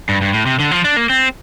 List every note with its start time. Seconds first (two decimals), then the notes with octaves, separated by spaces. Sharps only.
0.09 G2
0.21 G2
0.34 A2
0.46 C3
0.59 D3
0.71 F3
0.84 D4
0.97 A#3
1.10 C4